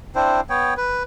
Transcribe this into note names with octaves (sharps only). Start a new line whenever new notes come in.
C4 D4 E4 C5
B3 C#5 G5
B4